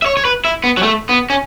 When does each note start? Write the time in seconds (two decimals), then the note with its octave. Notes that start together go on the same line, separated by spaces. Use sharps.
0.02 E5
0.06 C#5
0.17 C#5
0.25 B4
0.45 E4
0.64 B3
0.77 F#3
0.83 A3
1.09 B3
1.30 C#4